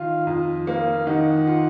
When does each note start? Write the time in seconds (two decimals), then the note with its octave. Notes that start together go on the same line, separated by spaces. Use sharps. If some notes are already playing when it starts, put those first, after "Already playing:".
Already playing: D#3 F4 F5
0.27 F2
0.67 A#3 F5
1.07 D#3 F#5
1.47 F4